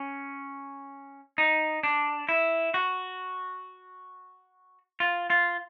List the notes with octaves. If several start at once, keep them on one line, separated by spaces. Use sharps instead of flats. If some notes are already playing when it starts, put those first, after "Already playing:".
Already playing: C#4
D#4
D4
E4
F#4
F4
F4